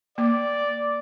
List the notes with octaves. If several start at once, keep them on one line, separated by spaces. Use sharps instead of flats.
A#3 D5